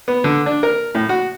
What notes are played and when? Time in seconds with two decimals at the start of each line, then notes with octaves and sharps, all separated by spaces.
0.08 B3
0.24 D3
0.46 D4
0.63 A#4
0.95 A2
1.09 F#4